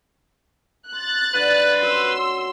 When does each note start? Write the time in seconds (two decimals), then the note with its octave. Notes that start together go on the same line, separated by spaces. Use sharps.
0.92 C6 F#6 A6
1.34 G2 D3 F4 B4
1.81 F#2 C#4 F#4 C6 E6